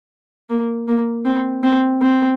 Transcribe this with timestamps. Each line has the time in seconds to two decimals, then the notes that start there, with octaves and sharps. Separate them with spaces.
0.50 A#3
0.88 A#3
1.25 C4
1.63 C4
2.02 C4